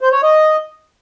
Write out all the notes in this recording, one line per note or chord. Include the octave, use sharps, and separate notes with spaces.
C5
C#5
D#5